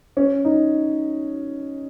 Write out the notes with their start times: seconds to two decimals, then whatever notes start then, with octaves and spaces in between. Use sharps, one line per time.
0.17 C#4
0.45 D#4